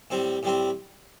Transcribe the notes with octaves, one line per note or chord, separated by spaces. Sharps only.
A2 G3 C4
A2 G3 C4